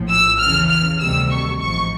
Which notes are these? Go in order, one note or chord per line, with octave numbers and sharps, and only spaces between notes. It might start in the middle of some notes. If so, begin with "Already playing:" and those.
Already playing: A#1 A2 F3
E6
E2 C#3 E3 F6
F6
D2 C3 D#3 G3 E6
C#6
A1 G#2 F3 C#6